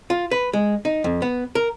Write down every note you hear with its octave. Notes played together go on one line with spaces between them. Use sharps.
F4
B4
G#3
D#4
F2
B3
A#4